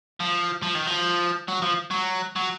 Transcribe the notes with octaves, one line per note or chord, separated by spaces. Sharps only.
F3
F3
D#3
F3
F#3
F3
F#3
F#3